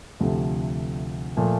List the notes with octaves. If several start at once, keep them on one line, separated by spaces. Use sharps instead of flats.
D2 C3 F3 A3
A#2 F3 A3